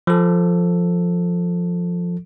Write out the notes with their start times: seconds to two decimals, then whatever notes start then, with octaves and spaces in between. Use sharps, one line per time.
0.07 F3 A4